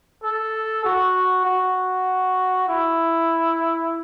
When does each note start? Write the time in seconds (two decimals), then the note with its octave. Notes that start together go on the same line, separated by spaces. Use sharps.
0.23 A4
0.85 F#4
1.46 F#4
2.69 E4